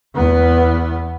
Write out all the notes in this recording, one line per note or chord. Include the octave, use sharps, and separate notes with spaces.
E2 B3